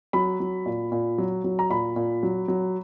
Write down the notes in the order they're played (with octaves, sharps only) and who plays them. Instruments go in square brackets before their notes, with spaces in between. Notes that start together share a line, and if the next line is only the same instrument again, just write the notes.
[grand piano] F#3 B5
F#3
A#2
A#2
F#3
F#3
A#5
A#2 B5
A#2
F#3
F#3